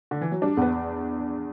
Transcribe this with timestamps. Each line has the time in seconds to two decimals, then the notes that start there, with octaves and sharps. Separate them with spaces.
0.11 D3
0.21 E3
0.31 F#3
0.42 G3 D4
0.57 E2 B3